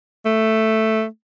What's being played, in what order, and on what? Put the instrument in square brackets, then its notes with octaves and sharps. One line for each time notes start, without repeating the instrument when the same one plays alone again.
[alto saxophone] A3